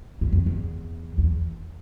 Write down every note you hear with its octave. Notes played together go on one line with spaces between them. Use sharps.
G2
F2
E2
E2